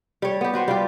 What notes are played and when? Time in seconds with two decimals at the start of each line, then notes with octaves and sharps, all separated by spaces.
0.22 G3 C#5
0.41 B3 G4
0.54 F#4 B4 C5 G5
0.68 G3 F4 G4